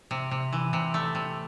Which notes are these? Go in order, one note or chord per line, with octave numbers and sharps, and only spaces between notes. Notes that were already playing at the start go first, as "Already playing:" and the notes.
C3
C3
E3
C3
A3
C3